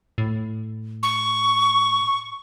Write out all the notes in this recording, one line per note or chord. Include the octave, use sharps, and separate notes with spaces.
A2
C#6